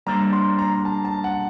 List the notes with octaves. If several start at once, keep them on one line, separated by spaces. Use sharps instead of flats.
G3 A#3 D4 A4 C5 A#5
C6
A#5
A5
A5
F#5